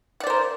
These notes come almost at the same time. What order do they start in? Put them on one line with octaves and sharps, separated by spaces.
F#5 D5 C5 A#4